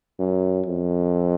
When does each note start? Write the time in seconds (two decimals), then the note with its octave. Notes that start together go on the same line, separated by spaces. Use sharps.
0.19 F#2
0.66 F2